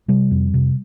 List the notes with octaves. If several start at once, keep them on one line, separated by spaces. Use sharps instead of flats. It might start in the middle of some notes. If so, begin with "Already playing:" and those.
C3 G3
F2
C3